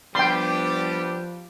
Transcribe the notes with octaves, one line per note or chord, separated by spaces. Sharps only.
F3 G3 B3 D4 G4 G5 C6